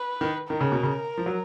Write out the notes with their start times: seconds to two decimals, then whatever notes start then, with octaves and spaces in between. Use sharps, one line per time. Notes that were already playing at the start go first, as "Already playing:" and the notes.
Already playing: B4
0.21 D#3
0.49 D#3 A#4
0.61 C#3
0.72 B2
0.83 C#3
1.18 F3
1.26 F#3